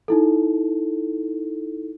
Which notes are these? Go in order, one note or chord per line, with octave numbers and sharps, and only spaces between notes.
D#4 E4 A4